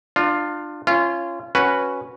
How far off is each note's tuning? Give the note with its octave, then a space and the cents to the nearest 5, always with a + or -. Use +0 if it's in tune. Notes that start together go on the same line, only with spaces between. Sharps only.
D4 +30 F4 +5
C#4 -5 F4 -25
C#4 +0 F#4 +0 B4 +0